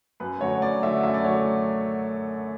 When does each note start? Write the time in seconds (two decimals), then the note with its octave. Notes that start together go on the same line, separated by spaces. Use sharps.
0.20 F#2 B4
0.41 D3 F#3 A3 C#5
0.62 F#2 D5
0.83 D3 F#3 A3 E5
1.03 F#2 E5
1.14 D5
1.24 D3 F#3 A3 C#5